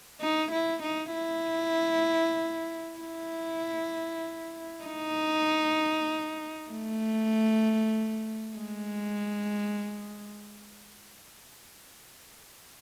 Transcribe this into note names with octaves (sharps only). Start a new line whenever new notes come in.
D#4
E4
D#4
E4
E4
D#4
A3
G#3